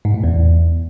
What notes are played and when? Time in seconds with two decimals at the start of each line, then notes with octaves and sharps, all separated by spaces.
0.05 G#2
0.14 A2
0.24 E2